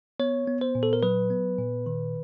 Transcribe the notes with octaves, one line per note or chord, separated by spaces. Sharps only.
B3 C#5
B3
C5
A#2
A4
A#4
F#3 B4
B3
A#2
D#3